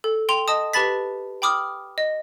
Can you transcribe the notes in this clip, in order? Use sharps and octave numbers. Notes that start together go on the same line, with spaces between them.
A4
G5 C6 F7
D#5 A5 D#6
G4 B4 A5 B5 A6 B6
G5 B5 D6 D#6 F6
D#5